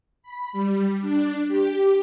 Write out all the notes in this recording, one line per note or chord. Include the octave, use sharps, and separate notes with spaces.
B5
G3
D4
G4